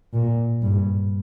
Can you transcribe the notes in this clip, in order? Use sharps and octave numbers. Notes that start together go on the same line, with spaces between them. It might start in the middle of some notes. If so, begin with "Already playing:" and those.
A#2
G2